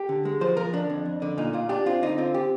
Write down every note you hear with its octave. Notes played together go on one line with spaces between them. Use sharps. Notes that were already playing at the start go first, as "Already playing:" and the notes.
Already playing: G4
D3
G#3
F3 C5
F3 A#4
D3 D4
F2
F2
D3
A#2 D#4
A#2 F4
D4 G4
C4 F4
D3 D#4
C4 F4
G4